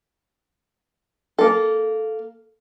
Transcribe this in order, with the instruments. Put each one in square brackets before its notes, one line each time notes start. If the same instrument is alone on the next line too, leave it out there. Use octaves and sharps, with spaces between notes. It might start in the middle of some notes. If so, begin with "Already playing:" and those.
[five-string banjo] A#3 A4